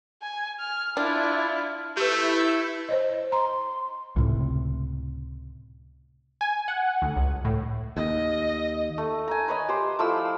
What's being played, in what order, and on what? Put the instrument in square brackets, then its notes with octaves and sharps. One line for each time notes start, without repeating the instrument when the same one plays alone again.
[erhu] G#5
F6
[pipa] D4 [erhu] E4 [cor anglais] F4
[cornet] A3 [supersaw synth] E4 [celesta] G4 B4 [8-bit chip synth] E6 G6
[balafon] C5 C#5 D#5
[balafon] A#5 [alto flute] C6
[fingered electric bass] C#2 A2 C3
[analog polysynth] G#5
F#5
D2
C#2
A2
[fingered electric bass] D#2 [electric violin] D#5
[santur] A3
G#5 A#5
B4 C#5 D#5
G4 C5
F3 A3 E4 E6